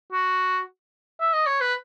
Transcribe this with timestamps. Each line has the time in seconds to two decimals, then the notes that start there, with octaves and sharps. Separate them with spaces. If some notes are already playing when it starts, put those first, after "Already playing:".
0.12 F#4
1.20 E5
1.33 D#5
1.46 C#5
1.61 B4